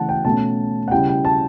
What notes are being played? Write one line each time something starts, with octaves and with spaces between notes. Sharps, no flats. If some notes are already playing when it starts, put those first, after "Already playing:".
Already playing: C#3 E3 A3 F#5 A5
G5
B2 A3 C#4 A5
F#5
C#3 G3 C#4 E4 G5
G5
A5